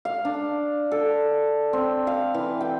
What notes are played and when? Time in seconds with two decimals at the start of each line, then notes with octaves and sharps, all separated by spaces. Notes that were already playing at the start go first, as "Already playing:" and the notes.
0.05 F5
0.25 D4
0.91 A4
1.73 C4
2.07 F5
2.34 E3
2.61 G5